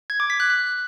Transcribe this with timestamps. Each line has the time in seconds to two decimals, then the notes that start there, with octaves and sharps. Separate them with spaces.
0.10 G#6
0.20 D6
0.30 B6
0.40 F#6
0.50 F#6